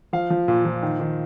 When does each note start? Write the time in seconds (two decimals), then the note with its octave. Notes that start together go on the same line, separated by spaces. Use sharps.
0.13 F3 F5
0.30 F3
0.48 A#2
0.65 F3
0.82 D#3
1.00 D#3